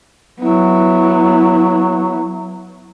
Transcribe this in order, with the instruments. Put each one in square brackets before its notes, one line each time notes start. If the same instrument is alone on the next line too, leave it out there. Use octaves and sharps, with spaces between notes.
[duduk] F#3 [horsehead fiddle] B3 E4